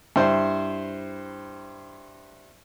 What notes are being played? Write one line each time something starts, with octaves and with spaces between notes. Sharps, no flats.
G2 E4 C5